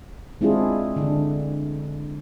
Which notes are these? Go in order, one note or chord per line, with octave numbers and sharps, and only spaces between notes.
G#3 C4 D4 E4 F4 G#4
D3 D4